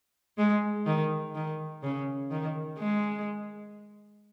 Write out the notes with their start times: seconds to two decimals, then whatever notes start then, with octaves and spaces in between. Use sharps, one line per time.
0.38 G#3
0.86 D#3
1.35 D#3
1.83 C#3
2.31 D#3
2.80 G#3